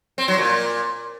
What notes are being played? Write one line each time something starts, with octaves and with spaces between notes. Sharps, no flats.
C4
F#3
A#2